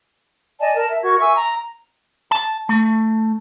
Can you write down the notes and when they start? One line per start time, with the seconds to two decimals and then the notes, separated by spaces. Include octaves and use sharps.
0.60 D5 D#5 G#5 A5
0.75 A#4 A5
0.89 E5
1.03 F#4 A#4 C#6 G#6
1.19 E5 G#5 C#6 E6
1.36 A#5
2.31 A5
2.69 A3